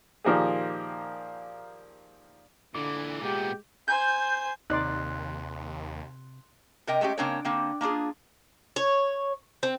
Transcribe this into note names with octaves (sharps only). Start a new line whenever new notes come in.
A#2 D#3 F3 A#3 G4 G#4
A#2 D3 E3 D6
A#2 G#3 B3 G4
C5 G#5 G6
D#2 C3 D#4 D5 C6 F#6
C3 A#4 D#5 G5
G#3 A3 C#4 G4
C#3 A#3 C4 D4 A#4 C#5
D3 A#3 C4
A#3 D4 F4 G#4
C#5
C4